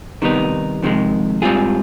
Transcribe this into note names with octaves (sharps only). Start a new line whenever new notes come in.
C3 D#3 G3 B3 D#4
F2 C3 D#3 G#3
G#2 G3 C4 F4 G#4